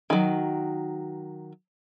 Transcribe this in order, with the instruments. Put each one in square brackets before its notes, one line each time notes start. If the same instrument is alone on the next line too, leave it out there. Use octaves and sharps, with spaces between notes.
[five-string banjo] D#3 F#3